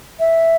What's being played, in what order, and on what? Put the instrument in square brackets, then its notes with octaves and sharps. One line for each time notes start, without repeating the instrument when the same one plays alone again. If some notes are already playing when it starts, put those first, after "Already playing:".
[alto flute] E5